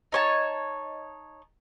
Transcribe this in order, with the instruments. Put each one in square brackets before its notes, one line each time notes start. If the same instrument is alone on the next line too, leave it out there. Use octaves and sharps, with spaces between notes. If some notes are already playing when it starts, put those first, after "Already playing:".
[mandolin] D#4 C#5 A5